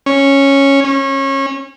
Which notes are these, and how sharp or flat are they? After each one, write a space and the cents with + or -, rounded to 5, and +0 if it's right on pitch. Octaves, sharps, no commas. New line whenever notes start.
C#4 -5
C#4 -25